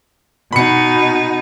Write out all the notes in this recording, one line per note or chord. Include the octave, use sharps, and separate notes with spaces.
B2 D#4 B5 C#7